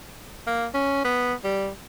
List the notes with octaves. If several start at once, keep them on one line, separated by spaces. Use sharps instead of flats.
A#3
C#4
B3
G3